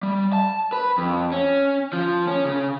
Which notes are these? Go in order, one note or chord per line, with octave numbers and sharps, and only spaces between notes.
G3
A5
B4
F2
C#4
F3
C#4
C#3